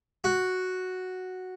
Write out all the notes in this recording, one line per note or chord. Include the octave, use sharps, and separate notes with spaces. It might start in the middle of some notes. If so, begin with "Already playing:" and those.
F#4